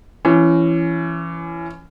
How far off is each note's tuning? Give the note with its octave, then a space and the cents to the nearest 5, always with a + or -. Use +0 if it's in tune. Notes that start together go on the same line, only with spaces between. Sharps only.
E3 +25 C#4 +0